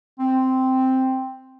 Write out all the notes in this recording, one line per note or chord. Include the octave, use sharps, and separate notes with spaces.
C4